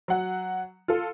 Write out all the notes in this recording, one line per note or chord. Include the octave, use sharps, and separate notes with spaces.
F#3 F#5
F4 A4